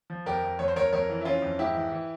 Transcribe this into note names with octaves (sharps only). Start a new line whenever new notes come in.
F3
F2 G4 A#4
F2
F2 C#5
C5
F2 A#4 C#5
F2 A#4 C#5
E3
E4
E3 C#4 F4
F2
G#2 E4 G4
E3
E3